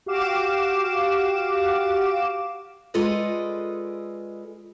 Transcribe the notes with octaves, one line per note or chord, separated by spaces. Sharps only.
F#4 G4 F5 D6 E7
G#3 F4 A4 B4 D5 D#5